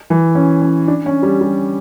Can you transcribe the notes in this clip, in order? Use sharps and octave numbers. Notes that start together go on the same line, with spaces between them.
E3
C#4
C#4
D4
C#4
G3
G3